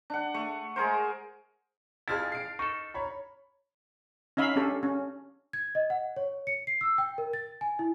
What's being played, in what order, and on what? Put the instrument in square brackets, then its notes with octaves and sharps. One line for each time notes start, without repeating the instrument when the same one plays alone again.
[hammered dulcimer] D4 F#5
A3 C#6
G#3 G#4 A#4 C5
[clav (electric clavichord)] F2 F3 E4 [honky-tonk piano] G#4 F6 G#6 [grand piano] A5 A6
[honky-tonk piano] C7 D7
[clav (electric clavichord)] F5
[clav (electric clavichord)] D#4 A4 [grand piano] C#6
[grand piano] C#5 A#5 B5
[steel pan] C#4 D#4 E5 F5 B5
C#4 D4 G4 A4
C#4
[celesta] G#6
D#5
F#5
C#5
C#7
C7
E6
G5
A#4
A6
G#5
E4